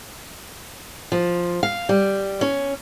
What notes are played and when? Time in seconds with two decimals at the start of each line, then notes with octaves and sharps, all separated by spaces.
1.12 F3
1.63 F5
1.89 G3
2.41 C#4